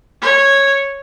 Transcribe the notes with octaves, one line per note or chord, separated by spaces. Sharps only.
C#5